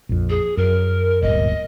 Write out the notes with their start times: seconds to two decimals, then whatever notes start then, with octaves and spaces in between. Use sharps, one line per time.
0.09 A#1 F2
0.30 G#4
0.57 F#2 A#4
1.22 D1 G1 A#2 D#5